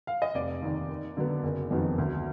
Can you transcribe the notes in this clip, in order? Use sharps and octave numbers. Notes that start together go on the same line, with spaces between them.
F5
D#5
F1 D5
D#2 D#3
D#2
D3 F#3 B3
F#1
F2 D#3 F#3 B3
D2